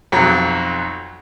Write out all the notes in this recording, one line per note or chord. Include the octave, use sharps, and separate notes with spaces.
B1 F2 F#3